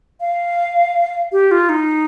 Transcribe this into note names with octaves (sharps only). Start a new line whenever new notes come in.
F5
G4
F4
D#4